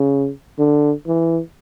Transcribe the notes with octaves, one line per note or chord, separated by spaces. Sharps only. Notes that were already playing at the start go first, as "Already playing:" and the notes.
Already playing: C#3
D3
E3